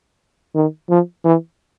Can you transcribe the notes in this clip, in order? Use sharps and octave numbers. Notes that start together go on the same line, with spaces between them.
D#3
F3
E3